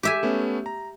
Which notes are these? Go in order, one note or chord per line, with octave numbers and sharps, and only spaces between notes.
G4 E5 G#5
A3 B3 C#4
A#5